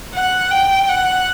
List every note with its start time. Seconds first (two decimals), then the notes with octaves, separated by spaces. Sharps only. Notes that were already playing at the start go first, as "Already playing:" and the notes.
0.14 F#5
0.51 G5
0.89 F#5